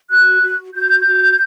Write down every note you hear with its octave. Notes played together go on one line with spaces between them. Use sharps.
F#4 F#6
F#4
F#4 G6
F#4